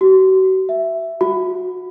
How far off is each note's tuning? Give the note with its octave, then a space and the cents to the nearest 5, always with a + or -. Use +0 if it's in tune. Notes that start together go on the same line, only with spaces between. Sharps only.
F#4 +35
E5 +5
F#4 -25